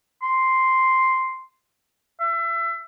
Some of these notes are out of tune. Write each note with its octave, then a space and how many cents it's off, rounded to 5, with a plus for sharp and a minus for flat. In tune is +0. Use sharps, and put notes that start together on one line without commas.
C6 +0
E5 +30